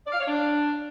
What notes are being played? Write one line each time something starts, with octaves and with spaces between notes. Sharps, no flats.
D5
F5
C#5
D4